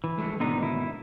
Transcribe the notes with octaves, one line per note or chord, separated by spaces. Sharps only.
E3
G2 G#3 A3
G#2 B2 D3 D#3 B3 D#4
E4